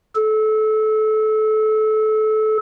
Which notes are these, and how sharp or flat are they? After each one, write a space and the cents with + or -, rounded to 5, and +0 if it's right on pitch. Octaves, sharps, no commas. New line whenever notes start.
A4 -25